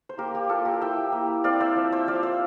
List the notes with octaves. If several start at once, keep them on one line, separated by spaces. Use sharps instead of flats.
C5
A#3 G4 A#4
G4
A#3 F4 A4
G4 A#4
E4 E5 G5
A#3
C4 D5 F5
C5 E5
F3
C5 E5
F3 D5 F5
C5 E5